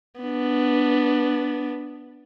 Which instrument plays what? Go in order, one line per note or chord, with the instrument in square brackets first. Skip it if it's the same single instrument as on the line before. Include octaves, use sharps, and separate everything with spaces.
[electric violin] B3 D4